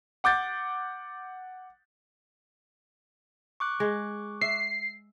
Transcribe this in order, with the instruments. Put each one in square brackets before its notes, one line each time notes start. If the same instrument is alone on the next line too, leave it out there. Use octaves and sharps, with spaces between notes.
[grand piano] F#5 D6 G6 A6
[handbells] C#6 D6 F#6
[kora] G#3
[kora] E5 [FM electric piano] C7